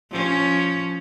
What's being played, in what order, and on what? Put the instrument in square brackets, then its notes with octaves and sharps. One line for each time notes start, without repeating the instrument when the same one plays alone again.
[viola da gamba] F3 C#4